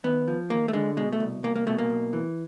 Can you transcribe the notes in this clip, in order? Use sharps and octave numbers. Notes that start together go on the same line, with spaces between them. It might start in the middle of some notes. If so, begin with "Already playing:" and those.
D#2 B3
F3
D#2 A#3
A3
D3 G#3
B2 G#3
A3
C2
C2 A#3
A#3
B2 A3
A#3
B1
E3